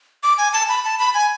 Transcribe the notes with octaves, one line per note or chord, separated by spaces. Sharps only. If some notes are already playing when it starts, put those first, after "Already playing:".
D6
G#5
A5
B5
A5
B5
G#5